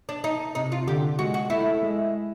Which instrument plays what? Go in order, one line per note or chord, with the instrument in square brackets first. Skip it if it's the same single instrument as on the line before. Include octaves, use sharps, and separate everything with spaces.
[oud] D4
D#4
[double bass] C3 [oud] D#4
[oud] F4
[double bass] D3 [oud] G4
[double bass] G#3 [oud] F#4
[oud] F#4
[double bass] A3 [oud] E4
[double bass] G#3